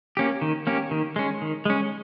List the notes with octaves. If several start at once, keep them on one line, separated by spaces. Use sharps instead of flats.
A#3 C#4 G4
D#3
A#3 C#4 G4
D#3
G#3 C#4
D#3
G#3 C#4